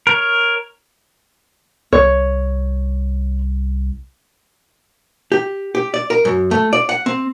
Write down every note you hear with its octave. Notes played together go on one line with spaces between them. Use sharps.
A#4 C#5
C2 C#5
G4
G4
D5
A#4
F#2
A3
D5
F#5
C4